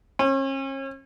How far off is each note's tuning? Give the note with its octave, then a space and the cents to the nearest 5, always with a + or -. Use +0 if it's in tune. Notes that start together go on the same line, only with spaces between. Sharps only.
C#4 -40